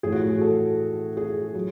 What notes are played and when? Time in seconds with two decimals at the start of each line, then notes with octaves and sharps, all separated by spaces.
0.03 A2 E3 G#4
0.12 F#4
0.21 G#4
0.41 A4
1.17 G#4
1.55 F#3